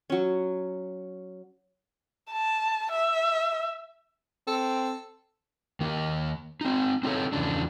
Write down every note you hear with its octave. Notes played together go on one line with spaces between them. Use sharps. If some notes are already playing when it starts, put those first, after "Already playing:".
F#3 C#4
A5
E5
C4 A4
D#3 A#3
C4 D#4
C4 D#4 A4 C#5
E2 C#3 D4